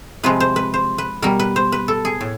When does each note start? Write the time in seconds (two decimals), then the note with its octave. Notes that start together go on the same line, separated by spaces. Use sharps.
0.23 C3 F3 G#3 B4
0.40 C5
0.56 B4
0.74 C5
0.98 B4
1.22 B2 G3 A#4
1.39 B4
1.56 C5
1.72 B4
1.88 A4
2.05 G#4
2.21 A2